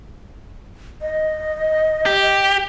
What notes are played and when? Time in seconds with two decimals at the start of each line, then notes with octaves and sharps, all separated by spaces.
1.02 D#5
2.06 G4